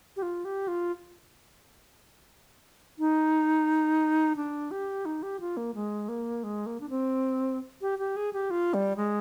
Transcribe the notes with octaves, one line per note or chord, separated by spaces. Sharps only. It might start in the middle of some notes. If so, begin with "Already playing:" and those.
G4
F4
G4
F4
D#4
D4
G4
D#4
G4
F4
A#3
G#3
A#3
G#3
A#3
D4
C4
G4
G4
G#4
G4
F4
G3
G#3